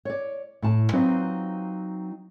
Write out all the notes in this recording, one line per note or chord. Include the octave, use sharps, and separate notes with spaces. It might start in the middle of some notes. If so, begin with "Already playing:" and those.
C#5 D5
A2 A5
F#3 C4 D#4 F4 B4 C5